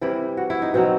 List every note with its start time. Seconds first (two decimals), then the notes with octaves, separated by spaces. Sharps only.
0.01 C3 E3 G3 E4
0.37 F#4
0.50 E4
0.62 D#4
0.74 B2 F#3 C4